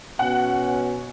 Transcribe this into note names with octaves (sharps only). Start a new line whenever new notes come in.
B2 C#4 F#5